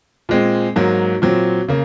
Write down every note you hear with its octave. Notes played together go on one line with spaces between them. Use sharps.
A#2 G#3 C4
G#2 F#3 A#3
A#2 F#3 C4
C#3 A#3